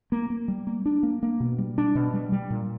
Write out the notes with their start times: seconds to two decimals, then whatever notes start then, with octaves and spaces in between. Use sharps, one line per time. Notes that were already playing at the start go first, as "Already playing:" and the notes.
0.12 A#3
0.30 A#3
0.48 G3
0.67 A#3
0.86 D4
1.03 A#3
1.23 A#3
1.40 B2
1.58 G3
1.78 D4
1.95 B2
2.13 G3
2.32 G3
2.50 A#2